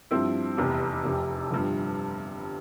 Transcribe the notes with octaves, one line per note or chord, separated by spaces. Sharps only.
G2 F3 C4 E4
F1 E2 C3
F1 F2 C3
G1 G2 F3